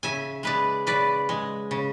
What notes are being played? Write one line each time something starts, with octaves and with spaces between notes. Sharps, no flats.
C#3 E5 G#5
G#3 B4 D5
C#3 B4 D5
G#3
C#3